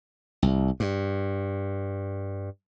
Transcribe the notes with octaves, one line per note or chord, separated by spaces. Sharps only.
C2
G2